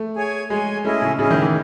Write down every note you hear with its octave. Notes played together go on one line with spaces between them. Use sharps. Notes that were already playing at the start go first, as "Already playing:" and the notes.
Already playing: A3
G#4 C#5 G#5
G#3 G#4 C#5 G#5
A3 C#4 E4 G#4 D#5
C#3
C#3 C#4 E4 G#4 D#5
D#3
E3